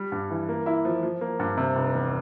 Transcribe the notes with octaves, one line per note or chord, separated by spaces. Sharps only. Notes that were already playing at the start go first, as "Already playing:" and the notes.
Already playing: G3
G2
E3
A#3
E4
F3
F3
A#3
G2
C3
F1
E2